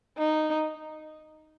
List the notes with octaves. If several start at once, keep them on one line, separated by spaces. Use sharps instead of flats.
D#4